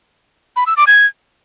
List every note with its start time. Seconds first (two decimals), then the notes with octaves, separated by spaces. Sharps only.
0.56 B5
0.66 E6
0.77 D6
0.87 G#6